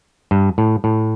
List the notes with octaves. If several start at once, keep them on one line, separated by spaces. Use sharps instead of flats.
G2
A2
A2